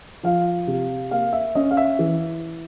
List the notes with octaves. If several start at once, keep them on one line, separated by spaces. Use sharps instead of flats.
F3 F5
C3
A#3 F5
E5
C#4 D#5
F5
E5
E3